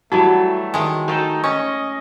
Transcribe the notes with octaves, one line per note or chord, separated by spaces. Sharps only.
E3 F#3 G3 A3 F#4 A5 A6
D#3 G#3
A3 D#4 A4 G5
C#4 D#5 C#6